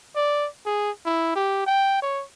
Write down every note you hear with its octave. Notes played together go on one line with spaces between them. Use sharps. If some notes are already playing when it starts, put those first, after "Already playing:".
D5
G#4
E4
G4
G5
C#5